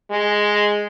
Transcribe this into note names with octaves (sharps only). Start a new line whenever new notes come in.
G#3